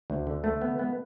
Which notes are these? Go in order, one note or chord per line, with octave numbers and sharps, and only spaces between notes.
D2
D3
A3
B3
B3